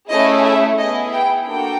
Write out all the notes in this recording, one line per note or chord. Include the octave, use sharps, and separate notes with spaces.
A3 C#4 E4 G#4 D#5
E5
B3 E4 G#4 D#5
G5
A#3 D4 F#4 A4 G5